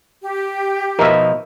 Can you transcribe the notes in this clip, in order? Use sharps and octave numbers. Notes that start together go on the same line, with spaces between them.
G4
B2 F3 D#4 A#4 E5